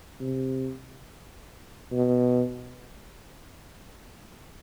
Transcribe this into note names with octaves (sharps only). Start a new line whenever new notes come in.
C3
B2